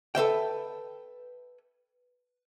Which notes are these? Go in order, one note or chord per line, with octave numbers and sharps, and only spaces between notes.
A4 B4 E5 G5